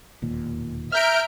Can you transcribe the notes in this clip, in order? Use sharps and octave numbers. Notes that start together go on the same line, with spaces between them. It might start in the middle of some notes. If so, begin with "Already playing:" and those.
E1 D#2 A#2
E5 A#5 F6 G6 D7